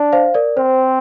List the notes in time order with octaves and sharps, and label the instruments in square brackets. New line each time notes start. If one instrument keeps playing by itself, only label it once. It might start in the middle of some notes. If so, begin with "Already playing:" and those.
Already playing: [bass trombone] D4
[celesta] C5 F5
A#4 D5
[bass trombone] C4 [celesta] C5